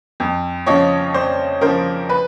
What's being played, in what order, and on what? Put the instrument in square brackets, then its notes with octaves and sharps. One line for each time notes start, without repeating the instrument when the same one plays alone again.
[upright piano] F2
C#3 F3 C#5 D#5
F2 C5 D5
C#3 F3 A#4 C5
B4